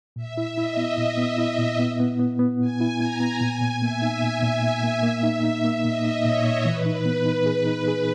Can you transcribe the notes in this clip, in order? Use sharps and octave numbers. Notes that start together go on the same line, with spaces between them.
A#2 E5
E4
E4 D#5
B3
A#2 E5
B3
E4
A#2
B3
B3
B3
B3
A#2 G#5
E4
B3 A#5
B3
A#2 G#5
A#2
A#3 E5
D#4
A#2
A#2
A#3
A#3
A#3
D#4
D#4
A#3
A#2 D#5
D#4
A#2 C#5
A#2
E3 B4
D#4
B3
D#4
G#4
D#4
G#4